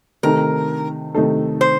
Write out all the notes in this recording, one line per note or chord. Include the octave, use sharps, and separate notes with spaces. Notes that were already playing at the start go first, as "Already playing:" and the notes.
C3 D#3 A3 D#4 A4 A#4
C3 D#3 A3 D#4 A4
C5